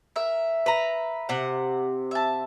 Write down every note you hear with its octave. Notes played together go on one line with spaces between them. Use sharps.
A#4 E5
B4 A#5
C3 F#5
E5 A5